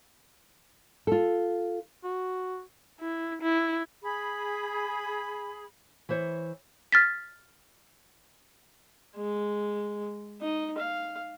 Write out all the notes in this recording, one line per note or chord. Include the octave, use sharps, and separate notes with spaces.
F4 A4
F#4
E4
E4
G#4 B5
E3 E4 C5 C#5
F6 A6 B6
G#3
D#4
F5